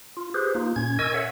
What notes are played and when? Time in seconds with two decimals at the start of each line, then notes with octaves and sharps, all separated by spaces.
0.17 F4
0.34 G4 G#4 B4 C5
0.55 A#3 D#4 F4
0.76 A#2 C#4 G#6
0.99 A#4 D#5 G#5 C#6 E6 G#6
1.14 A4 C#5 E5 F#5